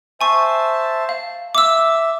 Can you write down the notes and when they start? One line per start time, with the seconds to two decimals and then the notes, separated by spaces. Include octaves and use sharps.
0.21 C5 E5 G#5 A5 C#6
1.09 F5
1.55 E5 D6 E6